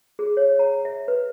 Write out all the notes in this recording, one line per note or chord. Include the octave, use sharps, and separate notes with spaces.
G#4
C#5
A#5
E5
B4